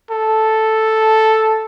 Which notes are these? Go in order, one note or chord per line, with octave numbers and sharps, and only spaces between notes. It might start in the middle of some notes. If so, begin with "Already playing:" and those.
A4